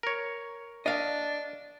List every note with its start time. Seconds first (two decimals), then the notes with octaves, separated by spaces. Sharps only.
0.03 A#4 C#5
0.86 D4 D#5 F5